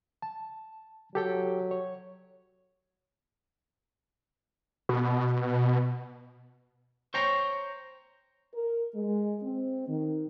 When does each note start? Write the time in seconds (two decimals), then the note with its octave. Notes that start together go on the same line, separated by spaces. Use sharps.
0.22 A5
1.15 F#3 G4 A4 G5
1.71 C#5
4.89 B2
7.14 C5 C#5 G5 A#5
8.53 A#4
8.94 G#3
9.42 C4
9.87 D#3